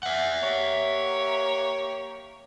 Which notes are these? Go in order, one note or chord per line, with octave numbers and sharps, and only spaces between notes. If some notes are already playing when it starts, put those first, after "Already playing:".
E5 F#5
A#3 G4 C#5